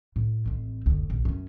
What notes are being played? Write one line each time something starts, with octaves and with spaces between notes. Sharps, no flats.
A2
A1 C4
F#1 D2
A#1
F#2 C#4